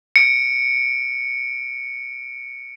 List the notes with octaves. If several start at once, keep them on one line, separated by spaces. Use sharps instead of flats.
C#7 D7